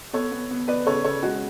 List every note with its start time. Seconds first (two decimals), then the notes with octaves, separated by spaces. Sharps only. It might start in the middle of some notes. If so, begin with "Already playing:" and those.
0.13 B3 A4 C#5
0.32 B3
0.50 B3
0.68 B3 B4 D5
0.86 C#3 A4 C#5
1.05 C#3 A4 C#5
1.23 G#3 F#4